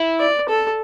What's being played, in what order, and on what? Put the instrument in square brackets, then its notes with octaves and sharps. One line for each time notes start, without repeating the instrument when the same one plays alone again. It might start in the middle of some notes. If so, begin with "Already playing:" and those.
Already playing: [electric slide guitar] E4
[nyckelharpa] D5
A4